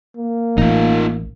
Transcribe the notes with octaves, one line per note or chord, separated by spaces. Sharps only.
A#3
A1 D#4 F4